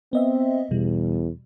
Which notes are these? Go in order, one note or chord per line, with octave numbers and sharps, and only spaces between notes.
B3 C4 D#5 E5
E2 B2 G3